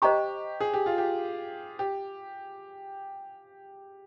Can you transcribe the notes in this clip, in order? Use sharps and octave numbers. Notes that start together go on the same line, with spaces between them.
G4 C5 D#5 A#5 C#6
G#4
G4
F4
G4
G4